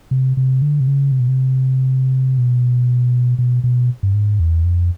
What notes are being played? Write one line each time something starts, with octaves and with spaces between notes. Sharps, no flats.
C3
C3
D3
C3
C#3
C3
B2
C3
B2
B2
B2
G2
G#2
E2
F2